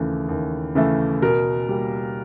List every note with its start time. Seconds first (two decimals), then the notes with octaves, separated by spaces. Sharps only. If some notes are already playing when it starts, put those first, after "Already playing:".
Already playing: D#2 C#3 E3 A3
0.29 D#2
0.75 C#3 E3 A3
1.22 B2 A#4
1.69 G3 A#3